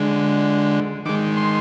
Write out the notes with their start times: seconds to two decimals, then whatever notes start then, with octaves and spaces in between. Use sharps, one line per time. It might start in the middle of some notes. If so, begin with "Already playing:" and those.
Already playing: D3 G#3
1.05 D#3 G#3 D6
1.37 C6